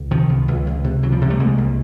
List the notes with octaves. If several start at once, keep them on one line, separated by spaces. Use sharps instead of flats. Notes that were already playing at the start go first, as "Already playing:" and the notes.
Already playing: C#2
C3 D#3 F3
C#2
C#2
C#2
C3
C#2 E3 F#3
F3 G3
C3
G3 A3
C2 G#3 A#3
C2